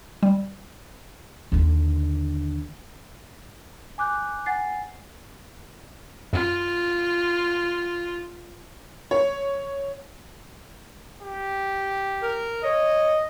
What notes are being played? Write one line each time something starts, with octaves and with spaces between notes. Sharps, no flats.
G3
D#2 D3
G#5 D6 F#6 G6
F#5 G#5 A6 C7
F#2 F4
C#5
G4
A#4
C#5 D#5